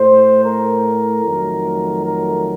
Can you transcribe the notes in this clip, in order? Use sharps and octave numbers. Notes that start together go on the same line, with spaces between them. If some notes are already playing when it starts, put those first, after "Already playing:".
Already playing: A2 A3 C5
A#4
F2 D#3 F#3 A3
A#4